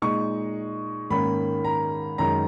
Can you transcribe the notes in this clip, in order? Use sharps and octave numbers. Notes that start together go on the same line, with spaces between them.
A#2 G#3 D#4 C#6
G#2 D#3 A#3 C#4 B5
A#5
F#2 D#3 G#3 A#5